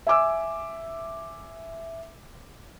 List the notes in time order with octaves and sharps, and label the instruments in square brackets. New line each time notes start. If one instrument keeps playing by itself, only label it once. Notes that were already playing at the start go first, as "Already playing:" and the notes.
[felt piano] E5 G#5 D6 E6